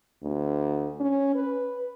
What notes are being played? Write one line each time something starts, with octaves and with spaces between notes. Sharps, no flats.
D2
C#4
B4